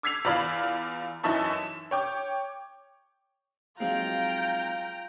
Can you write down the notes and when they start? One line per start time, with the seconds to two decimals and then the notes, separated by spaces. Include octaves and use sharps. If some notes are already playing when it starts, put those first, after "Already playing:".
0.03 D6 E6 G#6 B6 C7 F7
0.25 E2 F4 D5 F5 B5
1.23 F#2 E3 D#4 E5 A5 C#6
1.53 E7
1.91 C#5 G5 D6
3.80 F3 F#3 G#3 C4 D#4 F4 G5 A#5